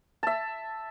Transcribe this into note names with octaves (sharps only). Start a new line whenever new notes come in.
E5 A5